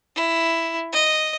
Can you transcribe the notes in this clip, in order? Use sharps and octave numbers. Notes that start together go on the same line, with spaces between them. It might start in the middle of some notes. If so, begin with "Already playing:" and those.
E4
D#5